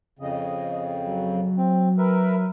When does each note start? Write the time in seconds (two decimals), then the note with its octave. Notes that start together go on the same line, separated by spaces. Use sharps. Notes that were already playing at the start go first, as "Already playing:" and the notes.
0.19 F2 C#3 D#5
1.05 F#3
1.58 C4
1.98 A#4 B4 E5